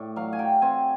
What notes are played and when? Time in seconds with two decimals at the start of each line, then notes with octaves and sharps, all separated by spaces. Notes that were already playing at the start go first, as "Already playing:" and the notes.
Already playing: A2 D5
0.16 F#3 F5
0.33 G#5
0.39 F#3 G5
0.62 C4 G#5